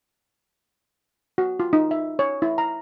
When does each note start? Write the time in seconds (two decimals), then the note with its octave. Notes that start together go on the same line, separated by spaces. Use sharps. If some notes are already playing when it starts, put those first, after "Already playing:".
1.38 F#4
1.60 F4
1.73 D#4
1.91 E5
2.19 C#5
2.42 E4
2.58 A#5